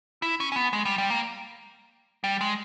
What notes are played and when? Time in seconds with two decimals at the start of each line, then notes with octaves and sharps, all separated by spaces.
0.22 E4
0.40 C#4
0.52 C#4
0.56 B3
0.73 G#3
0.85 G3
0.98 G3
1.10 A#3
2.24 G3
2.41 G#3